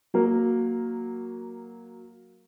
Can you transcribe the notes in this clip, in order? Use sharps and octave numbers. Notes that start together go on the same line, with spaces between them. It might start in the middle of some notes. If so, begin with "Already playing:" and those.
F#3 A#3 A#4